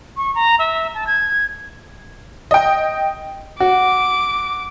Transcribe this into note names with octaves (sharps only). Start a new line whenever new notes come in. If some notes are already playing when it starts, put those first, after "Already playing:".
C#6
A#5
E5
A5
G#6
D#5 G5
F#4 D6